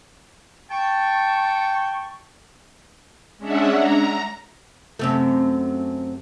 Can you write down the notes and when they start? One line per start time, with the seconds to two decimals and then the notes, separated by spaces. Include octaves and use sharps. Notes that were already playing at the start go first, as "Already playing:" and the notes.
0.71 G5 A5 C#6
3.38 G#3 C#4 D4 E5 F#5
3.73 A#5
4.99 F#2 C3 A3